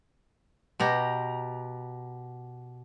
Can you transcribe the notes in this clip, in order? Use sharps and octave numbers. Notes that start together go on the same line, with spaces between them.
B2 G4 A#5